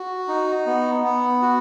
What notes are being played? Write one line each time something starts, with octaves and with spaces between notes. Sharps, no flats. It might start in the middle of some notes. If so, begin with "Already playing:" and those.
Already playing: F#4
D#4
B3
B3
F#4